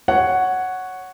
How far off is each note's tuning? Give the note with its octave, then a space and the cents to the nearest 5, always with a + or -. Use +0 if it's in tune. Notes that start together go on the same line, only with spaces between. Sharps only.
C#5 +0 F#5 +0